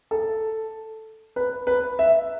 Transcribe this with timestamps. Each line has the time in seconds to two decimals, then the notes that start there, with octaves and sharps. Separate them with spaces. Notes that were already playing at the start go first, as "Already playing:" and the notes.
0.11 A4
1.36 B4
1.67 B4
1.99 E5